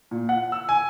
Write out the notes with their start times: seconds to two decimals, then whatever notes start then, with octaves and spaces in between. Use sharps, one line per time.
0.11 A#2
0.29 F#5
0.52 E6
0.69 G#5